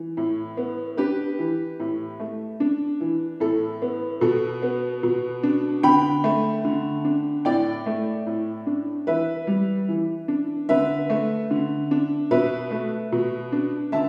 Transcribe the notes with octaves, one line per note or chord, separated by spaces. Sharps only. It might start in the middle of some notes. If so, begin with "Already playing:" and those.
Already playing: E3
A2
B3
D4 G4 B4
E3
A2
A3
D4
E3
A2 A4
B3
B2 A4
B3
B2
D4
D3 G5 B5
A3
D3
D4
A2 D5 G5
A3
A2
D4
E3 B4 E5
G3
E3
D4
D3 B4 E5
A3
D3
D4
B2 B4 E5
A3
B2
D4
D3 E5 A5